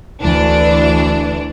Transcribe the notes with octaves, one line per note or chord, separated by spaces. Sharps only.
D2 E3 D4